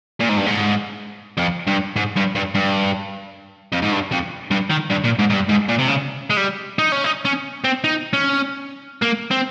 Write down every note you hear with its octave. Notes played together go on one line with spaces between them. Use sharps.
A#2
G#2
G2
G#2
F2
G2
G#2
G2
G2
G2
F2
G#2
G2
F2
G2
D#3
G2
A#2
G#2
G#2
G2
G#2
A#2
C3
C#3
G#3
G3
D#4
C#4
D#4
C#4
C4
D#4
C#4
A#3
C4